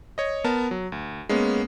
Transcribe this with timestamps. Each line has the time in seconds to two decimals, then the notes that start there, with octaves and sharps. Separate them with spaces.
0.18 C#5 D#5
0.44 B3 A#4 A5
0.71 F#3
0.92 D2
1.29 G#3 A#3 B3 C#4